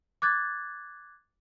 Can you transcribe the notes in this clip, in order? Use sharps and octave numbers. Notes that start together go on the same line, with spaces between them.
D6 F#6 G#6 A6